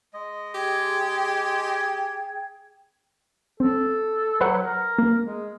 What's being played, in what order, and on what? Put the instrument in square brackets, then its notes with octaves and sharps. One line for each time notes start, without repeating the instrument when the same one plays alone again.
[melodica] G#3 D#5
[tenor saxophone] G4 [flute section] G#4 G5 G#6
[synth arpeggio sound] C4 [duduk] A4
[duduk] F#3 [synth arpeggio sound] B4 C5 F#5
[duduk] A#4
[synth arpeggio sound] A#3
[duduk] G#3